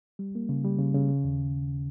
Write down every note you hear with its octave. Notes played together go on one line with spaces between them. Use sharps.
G3
A#3
C#3
G3
C#3
C#3
C#3
D#2